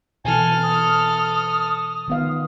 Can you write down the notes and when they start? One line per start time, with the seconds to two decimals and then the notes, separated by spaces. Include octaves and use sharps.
0.25 B2 E3 A4 G#5 F6
0.63 D#6
2.08 D#3 B3 F5